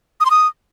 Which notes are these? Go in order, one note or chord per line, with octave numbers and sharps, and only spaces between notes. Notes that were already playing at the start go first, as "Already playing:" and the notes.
D#6
C6
D#6